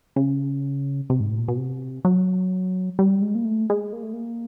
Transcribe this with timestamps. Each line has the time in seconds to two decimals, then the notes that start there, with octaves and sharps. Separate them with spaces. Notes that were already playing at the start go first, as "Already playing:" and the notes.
0.16 C#3
1.10 C3
1.20 G#2
1.29 A2
1.39 A#2
1.48 B2
1.57 C3
2.05 F#3
2.99 G3
3.22 G#3
3.35 A#3
3.45 A3
3.70 G#3
3.93 A#3
4.03 A3
4.13 A#3